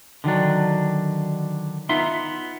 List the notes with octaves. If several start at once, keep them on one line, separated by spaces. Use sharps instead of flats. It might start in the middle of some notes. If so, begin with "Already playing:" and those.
D3 D#3 F#3 D4
B3 D#4 F4 E5 C6